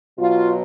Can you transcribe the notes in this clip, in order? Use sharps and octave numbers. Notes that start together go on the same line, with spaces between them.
B2 F#3 F4